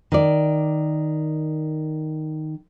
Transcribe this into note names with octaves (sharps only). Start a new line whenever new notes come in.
D#3 D5